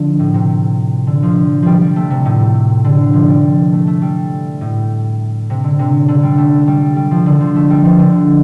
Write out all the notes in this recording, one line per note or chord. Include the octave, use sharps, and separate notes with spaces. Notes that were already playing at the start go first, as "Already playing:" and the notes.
Already playing: D3 F3
A2
C3
D3
F3
F3 G3
G3
A3
C3
A2
D3
F3
G3
A3
A3
G3
A2
C3
D3
C3
D3
G3
A3
G3
G3
F3
D3
F3
A3
G3
F3
D3